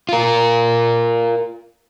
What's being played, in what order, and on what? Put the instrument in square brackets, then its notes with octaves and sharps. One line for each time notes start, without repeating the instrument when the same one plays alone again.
[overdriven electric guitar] F4 A#4